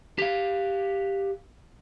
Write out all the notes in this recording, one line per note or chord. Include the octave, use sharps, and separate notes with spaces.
G4 F5